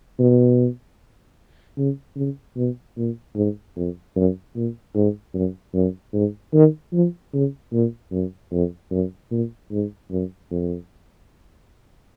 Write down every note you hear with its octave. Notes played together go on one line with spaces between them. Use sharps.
B2
C#3
C#3
B2
A#2
G#2
F2
F#2
A#2
G#2
F#2
F#2
G#2
D#3
F3
C#3
A#2
F#2
F2
F#2
A#2
G#2
F#2
F2